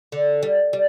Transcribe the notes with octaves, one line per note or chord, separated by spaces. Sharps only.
D3
G3
G3